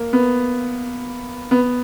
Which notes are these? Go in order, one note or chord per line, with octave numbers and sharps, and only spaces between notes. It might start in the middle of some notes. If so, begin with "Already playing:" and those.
Already playing: A#3
B3
B3